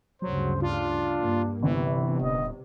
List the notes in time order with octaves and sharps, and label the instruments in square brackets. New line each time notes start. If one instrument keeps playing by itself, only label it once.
[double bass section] D2 G2 C#3 [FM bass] F#3 [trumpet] C5
[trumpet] D4 [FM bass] F4
[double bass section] G2 A#3
[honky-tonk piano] G1 [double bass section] C3 [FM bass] E3 [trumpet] E4
[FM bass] D#1 [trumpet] D#5